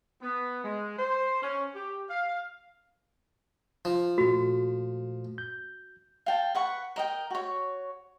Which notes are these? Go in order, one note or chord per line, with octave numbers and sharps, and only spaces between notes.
B3
G#3
C5
C#4
G4
F5
F3
A#2 A3 F#4
G6
F5 G5 A5
B4 F#5 C#6
A#4 D#5 G5
F#4 C#5